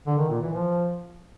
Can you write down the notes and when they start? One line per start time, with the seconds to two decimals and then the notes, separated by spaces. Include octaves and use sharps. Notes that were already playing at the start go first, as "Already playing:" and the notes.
0.07 D3
0.18 D#3
0.30 A#2
0.41 E3
0.52 F3